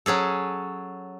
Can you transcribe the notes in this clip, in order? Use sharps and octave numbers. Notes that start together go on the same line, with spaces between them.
F#3 C#4 G#4 A4